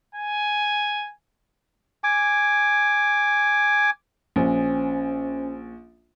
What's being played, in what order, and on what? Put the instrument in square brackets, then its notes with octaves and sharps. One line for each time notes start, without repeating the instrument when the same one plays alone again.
[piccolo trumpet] G#5
[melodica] G#5 D6
[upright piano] A#1 [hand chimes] C#4 C5 G#5